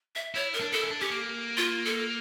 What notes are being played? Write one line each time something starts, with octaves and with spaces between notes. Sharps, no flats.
E5
E4 C#5
A#4
D4
E4 A4
C#4
D4
C#4 G4
A#3
F4
A4